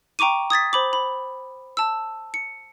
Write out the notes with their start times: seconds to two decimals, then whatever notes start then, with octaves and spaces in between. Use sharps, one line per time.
0.19 G5 A#5 C#6 D6 D#7
0.50 D#6 G#6 A6 B6
0.73 C5 B5 D6
0.93 B5
1.77 A5 E6
2.34 C#7